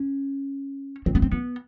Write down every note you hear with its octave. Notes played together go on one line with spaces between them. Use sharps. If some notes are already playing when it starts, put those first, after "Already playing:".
Already playing: C#4
C4
B3
C4
B3